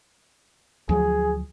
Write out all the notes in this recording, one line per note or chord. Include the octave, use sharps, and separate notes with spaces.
D2 F3 F#3 G#4